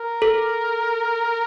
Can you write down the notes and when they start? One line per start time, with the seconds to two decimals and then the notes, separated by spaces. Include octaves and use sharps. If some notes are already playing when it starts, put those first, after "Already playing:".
Already playing: A#4
0.22 A4